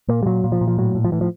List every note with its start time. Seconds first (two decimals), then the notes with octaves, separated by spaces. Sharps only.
0.08 A#2 A#3
0.23 G3
0.26 A#2 F#3
0.44 A#2
0.52 F3
0.61 A#2
0.68 F3
0.78 A2 F#3
0.95 A2
1.05 F3
1.12 A2 E3
1.21 F3